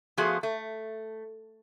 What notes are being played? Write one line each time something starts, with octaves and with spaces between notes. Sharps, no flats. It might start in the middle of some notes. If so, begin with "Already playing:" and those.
F3 A3 B3 F4 F#4 G#4
A3